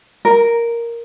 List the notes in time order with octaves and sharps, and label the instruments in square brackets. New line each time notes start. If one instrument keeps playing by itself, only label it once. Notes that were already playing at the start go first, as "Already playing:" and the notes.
[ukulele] A#4